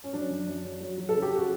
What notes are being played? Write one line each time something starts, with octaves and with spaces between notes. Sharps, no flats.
C#4
F#3 D4
F#2
F#2
F#3
F#3
F#3
A4
C#3
G4
F#4